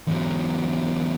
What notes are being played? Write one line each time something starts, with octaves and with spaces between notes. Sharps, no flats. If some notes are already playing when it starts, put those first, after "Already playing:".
E2 F#3